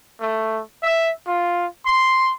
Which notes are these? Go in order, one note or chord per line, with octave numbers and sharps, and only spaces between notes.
A3
E5
F4
C6